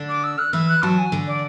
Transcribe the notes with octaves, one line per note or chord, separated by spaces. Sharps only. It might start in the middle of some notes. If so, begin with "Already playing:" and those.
Already playing: D3 D4
D6
E6
F#6
E3 E4 E6
F#6
F#3 F#4 A5
G#5
D3 D4
D5